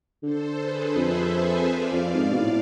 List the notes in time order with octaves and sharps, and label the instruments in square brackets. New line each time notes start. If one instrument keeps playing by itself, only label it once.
[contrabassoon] D3 [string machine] A4 C5
[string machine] G#4 B4
[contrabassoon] F2 [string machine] C5 E5
[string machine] E5 G#5
D5 F5
[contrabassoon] F2
G#2
B2
A2